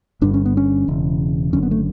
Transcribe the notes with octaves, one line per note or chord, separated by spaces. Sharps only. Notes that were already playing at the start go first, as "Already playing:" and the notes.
G1 G2 D3 D4
C#4
B3
C#4
E1 E2 C#3
F#1 F#2 D3 C#4
B3
A3